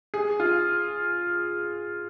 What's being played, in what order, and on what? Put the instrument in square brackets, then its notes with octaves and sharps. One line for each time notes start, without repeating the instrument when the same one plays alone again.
[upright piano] G#4
F4